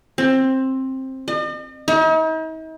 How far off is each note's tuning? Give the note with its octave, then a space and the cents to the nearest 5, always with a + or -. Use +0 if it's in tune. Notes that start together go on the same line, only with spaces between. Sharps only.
C4 +15
D#5 -45
D#4 +45